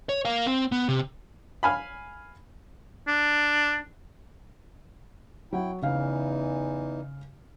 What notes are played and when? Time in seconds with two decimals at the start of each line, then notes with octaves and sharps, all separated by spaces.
0.09 C#5
0.25 A#4 F5
0.47 C4
0.72 B3
0.89 C3
1.63 F5 G#5 B5
3.08 D4
5.53 F#3 E4 F#5 G5
5.82 E2 C#3 E3 D#4 F5